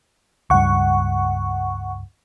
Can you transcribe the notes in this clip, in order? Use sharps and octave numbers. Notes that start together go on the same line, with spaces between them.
C#2 G2 F#5 C#6